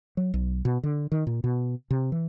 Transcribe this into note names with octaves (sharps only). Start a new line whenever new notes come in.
F#3
B1
B2
D3
D#3
A#2
B2
C3
E3